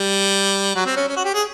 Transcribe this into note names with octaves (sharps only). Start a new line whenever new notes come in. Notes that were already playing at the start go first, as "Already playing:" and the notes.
Already playing: G3
F#3
C4
C#4
C#4
F#4
G4
G#4